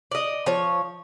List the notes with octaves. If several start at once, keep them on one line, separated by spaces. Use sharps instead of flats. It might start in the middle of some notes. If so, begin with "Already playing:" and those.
D5 D#5
F3 C#5